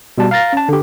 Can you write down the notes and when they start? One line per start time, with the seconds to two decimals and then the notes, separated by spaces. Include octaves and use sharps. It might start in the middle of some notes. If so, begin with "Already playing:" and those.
0.18 B2 G3 A5
0.31 F5 A#5 A6 A#6
0.53 C#4 A5
0.69 D3 G4